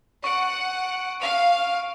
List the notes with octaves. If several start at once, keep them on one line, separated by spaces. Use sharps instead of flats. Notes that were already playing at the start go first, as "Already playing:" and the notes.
F#5 C#6 D7
F5 F7